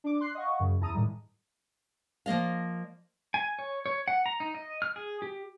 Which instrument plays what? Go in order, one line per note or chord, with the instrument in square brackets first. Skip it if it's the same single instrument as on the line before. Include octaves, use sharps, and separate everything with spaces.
[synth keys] D4 D6
C6 F#6 C7
D#5 F5 F#5 C#6
F#2 C#3
E2 E4 A5 A#5 D#6 D#7
A2 D#3 G3 G#3
[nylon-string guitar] F3 A#3 D#5 F5
[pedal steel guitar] G#5
C#5
C#5
F#5
A#5
D#4
D#5
F6
G#4
G4